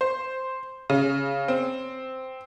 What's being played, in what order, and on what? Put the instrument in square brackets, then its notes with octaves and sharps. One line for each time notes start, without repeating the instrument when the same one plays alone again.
[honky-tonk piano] C5
C#3
C4